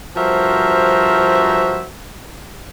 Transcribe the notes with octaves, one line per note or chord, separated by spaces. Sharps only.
G2 F3 F#4 A#4 C5 E5